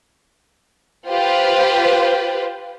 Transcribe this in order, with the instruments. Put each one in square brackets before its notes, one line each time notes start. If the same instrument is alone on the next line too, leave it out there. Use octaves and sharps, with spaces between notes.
[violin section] F4 G4 B4 C5